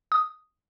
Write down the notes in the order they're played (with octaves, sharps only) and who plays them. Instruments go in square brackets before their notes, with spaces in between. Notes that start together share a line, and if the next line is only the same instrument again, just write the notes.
[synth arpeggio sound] D#6